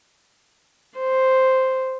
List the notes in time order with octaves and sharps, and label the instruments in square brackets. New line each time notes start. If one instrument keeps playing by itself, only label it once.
[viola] C5